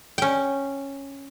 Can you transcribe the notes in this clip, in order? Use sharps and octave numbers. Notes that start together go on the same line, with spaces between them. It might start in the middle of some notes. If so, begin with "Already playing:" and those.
C#4 G5